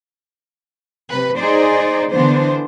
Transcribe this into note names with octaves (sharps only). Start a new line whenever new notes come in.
C3 B4
D#4 G#4 C5 D5
D3 E3 B3 D4 C5